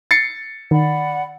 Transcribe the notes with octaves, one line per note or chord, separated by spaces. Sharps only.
A6 C7 C#7
D#3 D5 F#5 B5